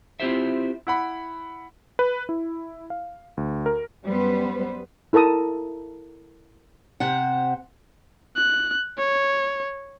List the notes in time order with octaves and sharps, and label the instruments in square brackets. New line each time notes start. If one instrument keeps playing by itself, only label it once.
[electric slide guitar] C4 E4 F4 G4 C5 E5
[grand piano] E4 F#5 B5
[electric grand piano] B4
E4
F5
D2
A#4
[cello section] F#2 G3 B3 B4 C5
[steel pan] E4 A4 A#4 A5 D#6
[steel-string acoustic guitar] C3 C5 F#5
[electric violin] F#6
C#5